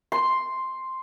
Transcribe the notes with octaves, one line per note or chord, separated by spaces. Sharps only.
C6